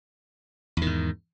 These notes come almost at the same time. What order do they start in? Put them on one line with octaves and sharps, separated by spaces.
E2 D#3 G#2